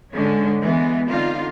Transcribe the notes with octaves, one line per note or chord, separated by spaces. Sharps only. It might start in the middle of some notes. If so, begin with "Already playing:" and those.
G#2 D3 G#3 C#4
E3 G#3 B3
D3 C4 D#4 F4 F5